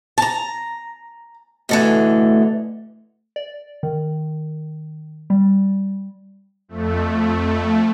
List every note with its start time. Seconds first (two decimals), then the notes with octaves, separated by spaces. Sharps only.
0.18 A5 A#5
1.69 B2 D3 E3 A3
3.36 D5
3.83 D#3
5.30 G3
6.68 F2 A3